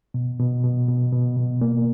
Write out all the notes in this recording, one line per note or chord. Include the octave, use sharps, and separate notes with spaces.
B2
B2
B2
B2
B2
B2
A#3